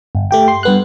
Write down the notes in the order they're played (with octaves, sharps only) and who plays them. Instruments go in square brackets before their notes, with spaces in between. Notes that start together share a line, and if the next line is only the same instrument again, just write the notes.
[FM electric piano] G1
A3 G4 G5
C6
G2 B3 F#6